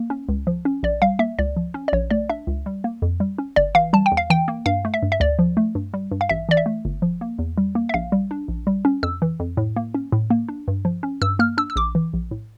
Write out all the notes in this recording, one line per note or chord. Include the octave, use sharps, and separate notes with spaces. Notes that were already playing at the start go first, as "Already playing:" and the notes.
Already playing: A#3
C#4
C#2
F3
C#4
A#1 D5
G3 F5
A#3 E5
C#2 D5
F3
C#4
D5
A#1 C#5
A3 D5
D4 E5
C#2
G3
A#3
F2
G3
C#4
G1 D5
E3 F5
G3 A5
G5
E2
F5
E3 G5
A#3
G2 F5
A3
E5
G2
E5
D2 D5
F3
A3
G2
G3
G2
F5
A1 E5
E3 D5
E5
A3
G1
F3
A#3
E2
G3
A#3
E5
A#1 F5
G3
D4
A#1
G3
C#4
F2 E6
E3
F2
A2
A#3
C#4
A2
A#3
D4
G2
F3
C#4
G2 E6
A#3 F6
D4 E6
E6
A#1 D6
E3
A#1
A2